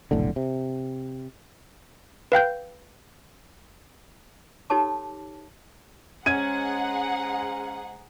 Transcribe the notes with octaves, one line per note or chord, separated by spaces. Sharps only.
F1 B1 A2 D3
C3
B4 F5 G5 G6
D#4 G4 A4 C#5 A5 D6
G#3 C#4 G#4 C5 F#5 A#5 G#6 D#7